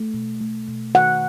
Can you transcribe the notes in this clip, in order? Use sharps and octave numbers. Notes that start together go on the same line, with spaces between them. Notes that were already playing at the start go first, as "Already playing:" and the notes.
Already playing: A3
B2
A3
B2
D#3 F#5